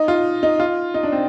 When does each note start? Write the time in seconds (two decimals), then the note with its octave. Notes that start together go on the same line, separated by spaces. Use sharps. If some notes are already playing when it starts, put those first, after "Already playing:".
Already playing: D#4
0.08 F4
0.43 D#4
0.60 F4
0.94 D#4
1.03 D4
1.12 C4